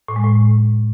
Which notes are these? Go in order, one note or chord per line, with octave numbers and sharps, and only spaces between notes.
A2
G#3
A2